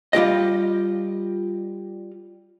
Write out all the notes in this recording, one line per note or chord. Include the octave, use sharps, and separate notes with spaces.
G3 F4 G4 D#5